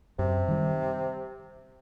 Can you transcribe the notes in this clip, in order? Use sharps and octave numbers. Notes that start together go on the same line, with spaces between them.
F#2 C3
D#3 G3